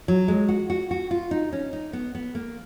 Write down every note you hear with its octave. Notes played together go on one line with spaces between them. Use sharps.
F#3
G#3
F#4
F#4
F#4
F4
D#4
C#4
D#4
B3
B3
A#3